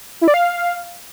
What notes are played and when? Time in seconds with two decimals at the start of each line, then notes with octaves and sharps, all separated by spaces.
0.21 E4
0.28 D5
0.34 F5